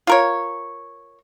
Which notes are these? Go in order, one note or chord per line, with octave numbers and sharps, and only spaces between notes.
F4 A#4 C#5